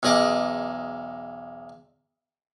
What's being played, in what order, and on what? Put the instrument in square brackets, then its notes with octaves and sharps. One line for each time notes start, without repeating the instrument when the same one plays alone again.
[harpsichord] B1 E2 G#4 D#5 D6